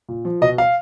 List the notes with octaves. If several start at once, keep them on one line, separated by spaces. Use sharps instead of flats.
A#2
F3
B2 D#5
F5